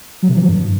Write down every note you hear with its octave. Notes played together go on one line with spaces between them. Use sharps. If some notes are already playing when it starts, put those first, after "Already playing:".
F#3
C3
E3
F#3
G2